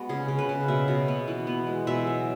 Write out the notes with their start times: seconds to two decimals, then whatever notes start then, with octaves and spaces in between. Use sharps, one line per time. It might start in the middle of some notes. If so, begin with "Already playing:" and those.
Already playing: G#3 B3 F#4
0.09 C#3 G#4
0.28 C#3
0.39 B4
0.49 C#3
0.68 B2 E5
0.88 B2
1.08 B3
1.28 E3
1.47 B3
1.67 G#3
1.87 B2 E5
2.07 F#3